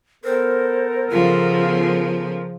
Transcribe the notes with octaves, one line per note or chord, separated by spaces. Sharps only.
B3 A4 A#4 C5
C#3 F3 F4